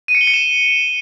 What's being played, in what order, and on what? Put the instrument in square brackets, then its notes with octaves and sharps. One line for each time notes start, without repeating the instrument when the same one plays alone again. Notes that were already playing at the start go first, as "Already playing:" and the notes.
[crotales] D#7
C#7
G7
C#7
E7